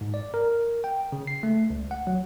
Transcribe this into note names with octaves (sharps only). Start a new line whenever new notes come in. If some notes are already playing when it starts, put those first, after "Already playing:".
G#2
D5
A#4
G5
C#3
C7
A3
C#2
F#5
F#3